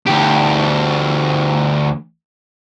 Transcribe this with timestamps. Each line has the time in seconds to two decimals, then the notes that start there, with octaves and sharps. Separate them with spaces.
0.06 D2 G4